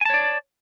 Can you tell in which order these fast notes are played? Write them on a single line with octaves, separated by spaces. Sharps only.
G#5 A5 C#5 D5